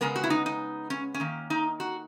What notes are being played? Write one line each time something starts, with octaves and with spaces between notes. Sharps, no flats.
C#3 G#3 B3 A#4
F#4
E4
D#4
D#4
C#4
C#4
D#3 A#3
D#4
F#4